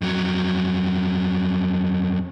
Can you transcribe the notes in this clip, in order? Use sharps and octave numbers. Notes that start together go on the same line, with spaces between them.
F2 F#3